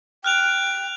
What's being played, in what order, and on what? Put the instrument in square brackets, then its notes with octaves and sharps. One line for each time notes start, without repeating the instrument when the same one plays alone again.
[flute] G5 [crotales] F6 F#6 F7